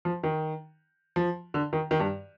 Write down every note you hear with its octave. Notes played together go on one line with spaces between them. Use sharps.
F3
D#3
F3
D3
D#3
D#3
G2